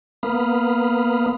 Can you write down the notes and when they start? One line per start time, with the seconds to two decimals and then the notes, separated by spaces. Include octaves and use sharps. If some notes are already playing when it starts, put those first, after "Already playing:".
0.23 A#3 B3 F5 B5 D#6